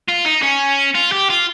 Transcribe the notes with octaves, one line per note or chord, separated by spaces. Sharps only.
F4
D#4
C#4
F4
G4
F4